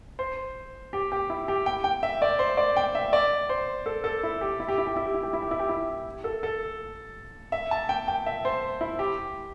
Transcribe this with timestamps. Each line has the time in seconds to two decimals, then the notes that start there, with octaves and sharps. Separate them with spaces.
0.19 C5
0.93 G4
1.12 G4
1.30 E4
1.48 G4
1.66 G5
1.84 G5
2.03 E5
2.22 D5
2.39 C5
2.57 D5
2.76 G5
2.95 E5
3.13 D5
3.49 C5
3.86 A4
4.04 A4
4.23 E4
4.41 G4
4.60 E4
4.68 G4
4.78 E4
4.87 G4
4.96 E4
5.06 G4
5.14 E4
5.23 G4
5.33 E4
5.42 G4
5.51 E4
5.60 G4
5.69 E4
6.24 A4
6.43 A4
7.52 E5
7.71 A5
7.89 G5
8.08 G5
8.26 E5
8.45 C5
8.81 E4
8.99 G4